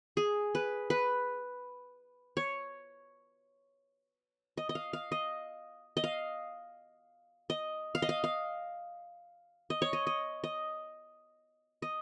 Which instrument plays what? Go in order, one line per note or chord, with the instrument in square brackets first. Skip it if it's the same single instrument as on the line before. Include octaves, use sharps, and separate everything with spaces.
[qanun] G#4
B4
B4
C#5
D#5
D#5
F5
F5
D#5
D#5
F5
D#5
F5
D#5
F5
F5
D#5
C#5
D#5
D#5
D#5
D#5